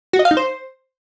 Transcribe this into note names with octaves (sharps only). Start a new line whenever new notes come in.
F#4
D#5
F5
D#4
C5